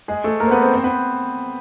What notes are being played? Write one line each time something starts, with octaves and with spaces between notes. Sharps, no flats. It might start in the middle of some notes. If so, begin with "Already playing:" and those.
G#3 G#4
A3 A4
A#3 A#4
C5
B3 B4
C4 C5
C4 C5
B3 B4